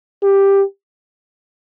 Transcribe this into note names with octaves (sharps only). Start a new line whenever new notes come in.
G4